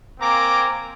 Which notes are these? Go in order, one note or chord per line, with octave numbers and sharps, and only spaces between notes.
A#3 C4 G#5 A#5 D6